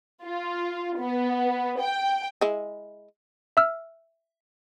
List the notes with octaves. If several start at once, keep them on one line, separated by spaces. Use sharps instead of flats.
F4
B3
G5
G#3 E4
E5 E6 F6